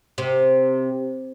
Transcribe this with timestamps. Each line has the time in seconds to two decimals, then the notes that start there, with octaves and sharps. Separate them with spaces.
0.18 C3